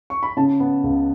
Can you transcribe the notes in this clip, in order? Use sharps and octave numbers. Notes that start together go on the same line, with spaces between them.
C#6
B5
C#3 A5
B3
C#2